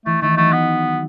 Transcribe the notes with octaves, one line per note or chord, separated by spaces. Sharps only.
E3 A3
D#3 A3
F#3 A3
B3